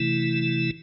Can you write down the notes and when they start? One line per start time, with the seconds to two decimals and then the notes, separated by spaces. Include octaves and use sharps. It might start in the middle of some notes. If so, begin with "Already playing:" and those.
Already playing: C3 E3 A3 E4